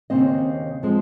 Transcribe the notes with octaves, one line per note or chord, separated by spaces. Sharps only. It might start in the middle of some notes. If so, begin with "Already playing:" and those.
D#2 C#3 G#3 C4 D#5
F3 G#3 C4